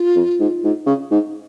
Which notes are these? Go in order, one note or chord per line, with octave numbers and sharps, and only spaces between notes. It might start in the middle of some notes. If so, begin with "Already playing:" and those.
Already playing: F4
F2
G#2
G#2
C#3
G#2